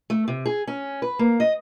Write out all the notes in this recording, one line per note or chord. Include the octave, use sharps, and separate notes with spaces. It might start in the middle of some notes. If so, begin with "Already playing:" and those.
A3
C3
G#4
C#4
B4
A#3
D#5